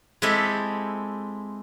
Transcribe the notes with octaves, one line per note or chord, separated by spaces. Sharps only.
G#3 C4 E4 G4 A4 E5